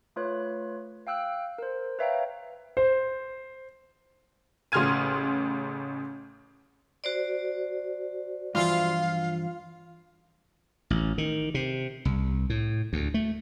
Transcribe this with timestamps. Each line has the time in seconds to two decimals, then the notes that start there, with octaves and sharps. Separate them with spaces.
0.16 A3 F4 B4 C#5 F#6
1.07 F5 G5 E6 F#6
1.58 A#4 C5
1.99 B4 C#5 E5 F5 G5 A#5
2.77 C5
4.72 A1 C#3 C6 F6 G#6 D#7
7.04 F#4 C5 D5
8.55 G2 E3 F3 F4 F5
10.90 A1
11.18 D#3
11.54 C3
12.05 C2
12.50 A2
12.93 D2
13.14 A3